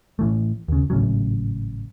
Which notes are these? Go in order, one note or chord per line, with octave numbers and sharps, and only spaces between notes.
A2 E3 A3
D#2 C#3
G#1 A2 C#3 F#3